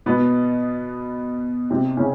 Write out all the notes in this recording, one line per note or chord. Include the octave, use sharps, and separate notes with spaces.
B2 B3
C3 C4
C#3 C#4